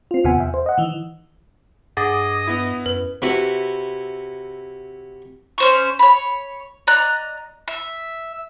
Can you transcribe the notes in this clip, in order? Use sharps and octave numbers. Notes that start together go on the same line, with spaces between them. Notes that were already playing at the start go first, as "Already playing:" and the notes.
C4 F4
D#2 C3 B3 F#5 G#5
E2 E5
C5
D#5 F#5
D#3 E3
G2 G#4 D#5 F#5 D6 A6
B3 E4
F#2 B4
C3 E4 F#4 B4
C#4 C5 C#6
C#5 B5
D5 D#5 A#5 F#6
E5